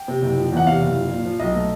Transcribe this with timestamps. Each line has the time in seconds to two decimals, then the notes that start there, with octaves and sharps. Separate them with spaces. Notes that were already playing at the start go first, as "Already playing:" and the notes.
Already playing: G5
0.08 C3
0.22 F#1
0.37 F3
0.52 E2 F#5
0.67 C3 F5
0.81 F#1
0.96 F3
1.11 A#2
1.26 F3
1.40 B1 D#5
1.55 A3